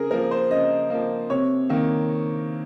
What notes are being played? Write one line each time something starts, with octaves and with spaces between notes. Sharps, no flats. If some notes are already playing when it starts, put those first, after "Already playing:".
Already playing: C#3 G#4 A#4
F3 A#3 A#4
C5
C#3 D#5
F3 A#3
C3 C#5
D#3 A#3